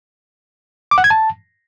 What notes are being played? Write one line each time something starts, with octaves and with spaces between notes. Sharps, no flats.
D6
F#5
G#6
A5